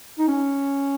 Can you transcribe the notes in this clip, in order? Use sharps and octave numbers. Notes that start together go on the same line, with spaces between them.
D#4
C#4